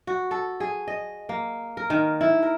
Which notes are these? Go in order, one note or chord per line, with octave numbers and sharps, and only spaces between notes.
F#4
A4
G#4
D#5
A#3
A#4
D#3
E4
A#4